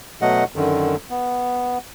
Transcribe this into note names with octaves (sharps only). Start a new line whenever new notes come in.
B2 F#3 A3 D#5 F#5
F#2 D3 D#3
B3